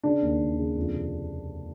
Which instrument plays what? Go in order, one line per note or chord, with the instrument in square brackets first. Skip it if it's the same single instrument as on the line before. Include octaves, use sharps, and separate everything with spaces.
[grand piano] C#3 D4
D#2
D#2
C#3
F2
C3